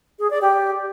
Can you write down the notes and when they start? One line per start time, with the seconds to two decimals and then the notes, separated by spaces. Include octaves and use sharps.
0.19 G#4
0.30 D5
0.41 G4